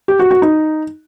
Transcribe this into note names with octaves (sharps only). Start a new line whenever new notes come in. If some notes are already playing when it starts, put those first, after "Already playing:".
G4
F#4
F#4
D#4